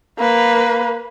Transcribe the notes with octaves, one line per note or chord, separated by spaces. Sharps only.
A#3 B4